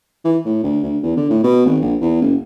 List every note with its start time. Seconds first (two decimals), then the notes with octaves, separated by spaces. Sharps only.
0.24 E3
0.45 A2
0.63 D2
0.83 D2
1.03 E2
1.17 D3
1.30 A2
1.44 B2
1.66 G#1
1.81 A#1
2.01 E2
2.22 F#1